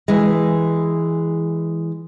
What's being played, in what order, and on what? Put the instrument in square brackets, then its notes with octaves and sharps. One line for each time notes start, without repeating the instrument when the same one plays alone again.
[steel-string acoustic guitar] E3 G#3